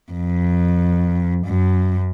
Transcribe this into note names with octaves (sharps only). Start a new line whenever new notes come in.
F2
F#2